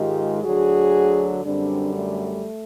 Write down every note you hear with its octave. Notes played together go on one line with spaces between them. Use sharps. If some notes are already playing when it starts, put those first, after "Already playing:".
Already playing: G#2 D#3 G#3 F4 G4
D2 D3 F#3 F#4 G#4
F#2 D3 G3 C4 D4
A3